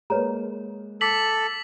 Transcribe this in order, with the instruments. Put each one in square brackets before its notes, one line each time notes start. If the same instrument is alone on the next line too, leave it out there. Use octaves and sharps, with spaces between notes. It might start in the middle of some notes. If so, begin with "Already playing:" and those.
[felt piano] G#3 A#3 [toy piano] B4 C#5 A#5
[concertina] A4 [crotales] D6 B6 F#7